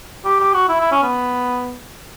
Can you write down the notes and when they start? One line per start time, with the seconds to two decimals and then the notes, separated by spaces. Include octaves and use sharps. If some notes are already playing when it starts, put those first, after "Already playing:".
0.25 G4
0.40 G4
0.54 F#4
0.69 E4
0.80 E4
0.92 C#4
1.03 B3